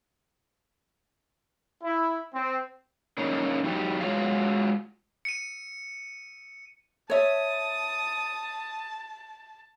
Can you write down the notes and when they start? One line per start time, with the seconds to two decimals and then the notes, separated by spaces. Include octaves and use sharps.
1.83 E4
2.34 C4
3.18 D3 A#3 C#4 D#4
3.64 E2 F#3 D#4 G4
4.01 G#3 A3 F4 F#4 C#5 F5
5.25 C#7 D#7
7.10 C#5 E5 A5 D#6